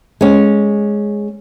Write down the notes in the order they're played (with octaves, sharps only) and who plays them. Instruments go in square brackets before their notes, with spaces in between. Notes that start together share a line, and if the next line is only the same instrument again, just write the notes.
[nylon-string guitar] G#3 C#4